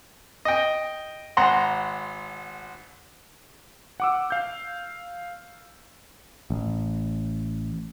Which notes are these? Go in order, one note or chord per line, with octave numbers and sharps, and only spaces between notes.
D#5 G5
G#1 F#5 A#5 C6
F#5 D6 E6
F5 G6
A1